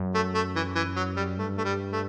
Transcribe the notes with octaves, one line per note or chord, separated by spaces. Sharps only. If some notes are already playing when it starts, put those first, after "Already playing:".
Already playing: F#2
A3
A3
E3
E3
F#3
G3
G2 A3
A3
G3
A3